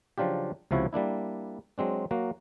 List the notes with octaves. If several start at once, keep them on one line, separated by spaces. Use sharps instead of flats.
C#3 F3 F#3 D4 F4 G4
C#2 C3 F3 E4 F#4 C#5
G3 A#3 D4 E4
F#3 G#3 C4 D4
F#3 A#3 F#4